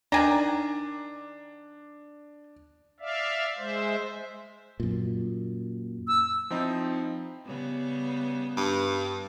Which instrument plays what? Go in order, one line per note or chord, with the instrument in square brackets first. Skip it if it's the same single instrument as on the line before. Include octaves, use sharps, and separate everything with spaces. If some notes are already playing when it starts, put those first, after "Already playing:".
[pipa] D#3 G#5 A#5 [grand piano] D4
[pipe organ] D5 E5 F5
G#3 C5 E5
[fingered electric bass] F#2 A#2
[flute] E6
[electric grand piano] F3 C4 D#4 E4
[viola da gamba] C#3 G3 B3
[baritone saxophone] G2